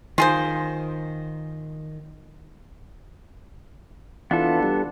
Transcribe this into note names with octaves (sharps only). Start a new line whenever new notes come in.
D#3 F4 G#4 C5
E3 B3 D4 F4 A4
G3